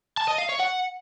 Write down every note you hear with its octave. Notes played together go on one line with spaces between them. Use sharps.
A5
D#5
F5
C#5
F#5